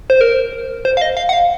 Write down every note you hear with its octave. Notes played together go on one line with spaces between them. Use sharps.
C5
A#4
C5
F5
D#5
F5
F#5
F5